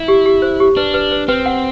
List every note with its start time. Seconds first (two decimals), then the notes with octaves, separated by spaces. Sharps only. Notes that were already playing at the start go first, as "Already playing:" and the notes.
Already playing: E4
0.08 G4
0.26 G4
0.42 C5
0.60 G4
0.77 D4 B4
0.94 B4
1.11 B4
1.28 C4 B4
1.46 F#5